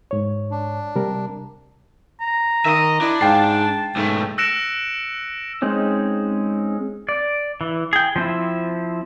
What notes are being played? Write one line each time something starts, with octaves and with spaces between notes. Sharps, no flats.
G#2 C#5
D4
C3 G3 A#4
A#5
D#3 D#5 E5
D4 E4
G#2 F5 G5 A5 C7
B1 G#2 A3
E6 F#6 A#6 C#7 D7 E7
G#3 C4 C#4 D#4
D5
E3
G#4 G5
F3 C4 E4